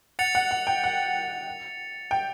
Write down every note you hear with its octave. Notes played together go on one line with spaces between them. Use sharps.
F#5 A6 C#7 F7
F#5
F#5
G5
F#5
G5